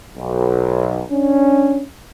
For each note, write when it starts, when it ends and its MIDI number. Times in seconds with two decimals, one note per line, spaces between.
0.17 1.03 35
1.10 1.83 61
1.10 1.83 62